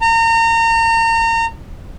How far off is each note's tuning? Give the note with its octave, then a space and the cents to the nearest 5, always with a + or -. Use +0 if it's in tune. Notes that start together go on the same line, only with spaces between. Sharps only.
A#5 -35